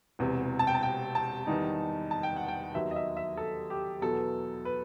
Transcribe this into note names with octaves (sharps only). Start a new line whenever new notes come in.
E1 E2 C3
A5
G5
A5
G5
A5
E2 D#3 G3 D#4
A5
G5
F#5
G5
D#2 D#3 F#3 B3 E5
D#5
E5
E5
A4
G4
E2 B2 F#3 B3 A4
B4